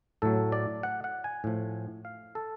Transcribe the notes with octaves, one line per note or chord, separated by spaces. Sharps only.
A2 F#3 A4
D5
F#5
F#5
G#5
A2 F3
F5
A4